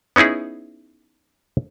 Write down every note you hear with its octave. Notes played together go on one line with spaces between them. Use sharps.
B3 C#4 D#4 E4 G#4